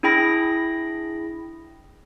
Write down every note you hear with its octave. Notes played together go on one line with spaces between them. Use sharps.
D4 E4 G#4 G5 B5 A#6